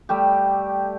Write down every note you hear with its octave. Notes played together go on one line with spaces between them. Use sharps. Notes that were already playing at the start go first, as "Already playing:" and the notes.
G3 A3 G4